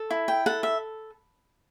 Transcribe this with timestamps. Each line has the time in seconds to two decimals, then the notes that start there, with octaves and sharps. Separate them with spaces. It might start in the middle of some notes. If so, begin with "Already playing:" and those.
Already playing: A4
0.11 E4
0.28 G5
0.46 A4 F#5
0.63 E5